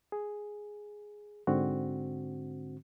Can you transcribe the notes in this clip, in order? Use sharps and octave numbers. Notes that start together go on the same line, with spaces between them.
G#4
G#2 D3 C4 F#4